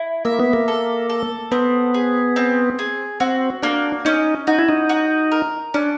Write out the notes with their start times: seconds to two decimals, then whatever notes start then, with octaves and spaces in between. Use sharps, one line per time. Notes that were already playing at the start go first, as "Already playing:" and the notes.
Already playing: E4
0.25 A#3 E5
0.40 B3
0.53 A#3
0.68 A4
1.10 A4
1.52 B3 C4
1.94 G#4
2.36 C4
2.79 G#4
3.20 C4 F#4
3.63 A#3 D4
4.05 C#4 D#4
4.47 D#4 F#4
4.59 E4
4.69 D#4
4.89 F#4
5.32 A#4
5.74 C#4 D4